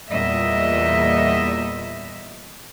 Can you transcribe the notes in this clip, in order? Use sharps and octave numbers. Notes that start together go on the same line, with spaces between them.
E2 A#2 G3 D#5 E5